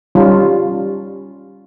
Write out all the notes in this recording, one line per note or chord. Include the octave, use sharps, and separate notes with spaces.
G3 C#4 D#4 F4